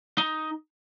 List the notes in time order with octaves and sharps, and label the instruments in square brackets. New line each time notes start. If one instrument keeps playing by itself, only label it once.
[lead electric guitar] D#4